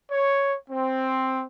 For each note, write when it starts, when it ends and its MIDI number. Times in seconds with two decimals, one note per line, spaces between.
0.11 0.57 73
0.70 1.45 60